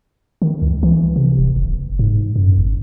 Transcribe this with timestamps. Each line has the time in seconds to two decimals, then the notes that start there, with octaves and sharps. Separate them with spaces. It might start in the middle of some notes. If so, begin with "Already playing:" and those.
0.42 D#3
0.62 C#2
0.83 E3
1.16 C3
1.39 D1
1.56 F#1
1.99 G#2
2.36 F#2
2.58 G1